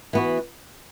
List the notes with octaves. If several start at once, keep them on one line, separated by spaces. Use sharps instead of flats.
E3 B3 F#4